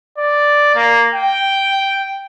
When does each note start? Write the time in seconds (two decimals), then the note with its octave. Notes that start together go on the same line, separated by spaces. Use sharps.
0.18 D5
0.76 A#3
1.15 G5